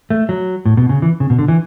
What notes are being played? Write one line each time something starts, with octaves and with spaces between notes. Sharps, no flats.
A3
F#3
A2
B2
C#3
E3
C#3
B2
D3
E3